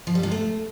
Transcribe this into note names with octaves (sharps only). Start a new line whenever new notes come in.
F3
G3
C3
A3